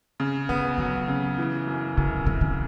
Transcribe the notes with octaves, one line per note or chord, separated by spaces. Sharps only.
C#3
D3 B3
D3 F#3
C#3
E3
F#2
F#2 C#3
F#2 C#3
D3